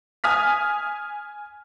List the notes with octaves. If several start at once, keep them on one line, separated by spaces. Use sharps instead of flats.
G#5 D#6 F6 B6